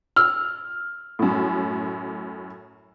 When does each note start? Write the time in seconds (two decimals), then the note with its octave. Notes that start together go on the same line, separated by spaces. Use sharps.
0.16 E6 F6
1.19 F#2 A2